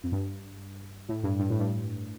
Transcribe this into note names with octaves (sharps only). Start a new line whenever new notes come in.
F2
G2
A2
G2
G2
A2
G2